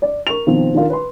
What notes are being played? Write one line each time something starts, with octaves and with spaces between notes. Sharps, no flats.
D5
A#4 C#6 F7
B2 D#3 F3 C4
D#3 D4 F4 A#4
B4 C6